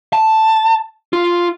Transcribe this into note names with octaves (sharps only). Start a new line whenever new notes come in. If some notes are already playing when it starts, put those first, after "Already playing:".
A5
F4